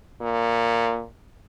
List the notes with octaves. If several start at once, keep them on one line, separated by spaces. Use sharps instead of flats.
A#2